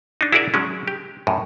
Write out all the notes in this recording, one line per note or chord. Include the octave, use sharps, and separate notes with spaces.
D4 D#4
E4 F#4 G#4 A#4 D5 E5
F#3 G#3 C#4
G4
F#2 A2